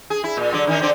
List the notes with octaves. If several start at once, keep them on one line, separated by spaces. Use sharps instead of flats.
G#4
E4
A#2
D3 F#3 D5
D#3 C#4 D#4
D3 C4 D5